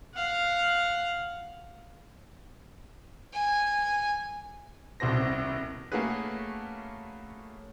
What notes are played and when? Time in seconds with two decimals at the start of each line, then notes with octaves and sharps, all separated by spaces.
0.14 F5 F#5
3.34 G#5
5.00 D#1 C2 B2 C5 A#6
5.92 A3 A#3 C#4 F#4 G#4 B4